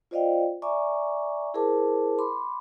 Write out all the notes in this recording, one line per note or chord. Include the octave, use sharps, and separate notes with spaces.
F4 C5 D5 D#5 F5 G5
D5 E5 G#5 A#5 C#6 D6
E4 G#4 A#4 C5 A5 D6
B5 C6 D6